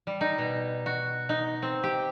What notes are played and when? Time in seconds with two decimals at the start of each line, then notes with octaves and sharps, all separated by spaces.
0.07 G3
0.21 D#4
0.38 B2
0.86 F#4
1.29 D#4
1.62 C4
1.83 G4